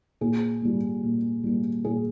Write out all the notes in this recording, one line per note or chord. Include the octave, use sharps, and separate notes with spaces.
A#2 G#4
G3 A#3
A#2
G3 A#3
A#2 G#4